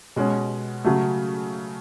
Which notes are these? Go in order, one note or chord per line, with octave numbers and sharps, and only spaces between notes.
B2 G#3 C#4
C#3 F#3 A3